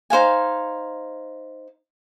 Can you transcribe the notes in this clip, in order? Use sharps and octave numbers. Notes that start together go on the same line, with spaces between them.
D#4 C5 F5 G#5